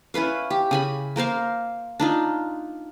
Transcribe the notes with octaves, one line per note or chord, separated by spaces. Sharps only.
C#4 E4 B4 F5
G4
C#3 G#5 B5
A#3 A#4 C5 F5
D4 D#4 F4